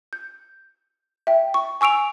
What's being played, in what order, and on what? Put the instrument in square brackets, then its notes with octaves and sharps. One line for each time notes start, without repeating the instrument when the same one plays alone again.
[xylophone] G6
E5 G5
C#6
G#5 C#6 E6 D7 F7